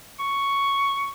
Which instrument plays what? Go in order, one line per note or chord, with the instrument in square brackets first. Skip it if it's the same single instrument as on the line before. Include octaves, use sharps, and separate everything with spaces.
[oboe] C#6